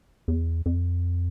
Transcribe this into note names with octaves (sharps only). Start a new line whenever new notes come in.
E2
F2